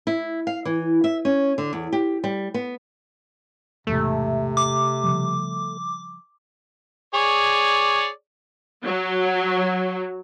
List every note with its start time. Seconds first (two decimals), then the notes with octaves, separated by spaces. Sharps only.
0.07 E4
0.47 F5
0.65 E3
1.04 E5
1.25 C#4
1.58 D3
1.73 E2
1.92 G4
2.24 G3
2.54 B3
3.87 B1 E2 G#2 C3 A3
4.57 D6
5.04 C#3 F3 G3
7.14 G#4 C#5 D5
8.84 F#3